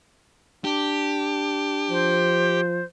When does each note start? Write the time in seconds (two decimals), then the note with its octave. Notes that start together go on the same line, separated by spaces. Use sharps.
0.64 D4 G4
1.90 F3 C5